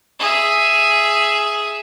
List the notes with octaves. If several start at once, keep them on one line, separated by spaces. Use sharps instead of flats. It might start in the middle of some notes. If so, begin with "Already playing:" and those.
G#4 E5